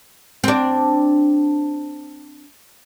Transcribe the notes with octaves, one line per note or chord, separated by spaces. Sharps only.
C4 D4